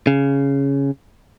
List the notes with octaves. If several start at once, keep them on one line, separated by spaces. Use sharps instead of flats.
C#3